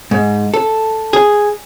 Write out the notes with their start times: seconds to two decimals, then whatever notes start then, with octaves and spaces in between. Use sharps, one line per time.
0.11 G#2
0.54 A4
1.13 G#4